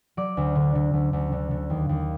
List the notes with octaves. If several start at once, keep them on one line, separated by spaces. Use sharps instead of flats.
F#3 D5 D6
D2
D3
D3
D2
D2
D3
D3
D#2
D#2